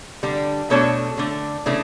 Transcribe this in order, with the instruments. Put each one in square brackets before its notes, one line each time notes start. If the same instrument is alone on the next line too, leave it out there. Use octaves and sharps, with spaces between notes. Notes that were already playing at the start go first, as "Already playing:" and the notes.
[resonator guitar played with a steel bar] D3 G3 D4
B2 A3 D4 A4 C#5
D3 A3 D4
C#3 E3 A3 D4